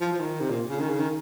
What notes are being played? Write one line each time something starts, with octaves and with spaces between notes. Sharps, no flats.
F3
F3
D#3
C3
A#2
C#3
D#3
C#3
D#3